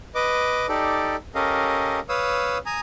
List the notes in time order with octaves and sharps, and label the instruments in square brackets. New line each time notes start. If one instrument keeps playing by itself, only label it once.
[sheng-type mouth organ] B4 D#5 D6
D#4 G4 A4 D5
C#4 G4 A4 A#4 D#5 F5
B4 C#5 F5 D#6 E6
G#5 A#5 D#6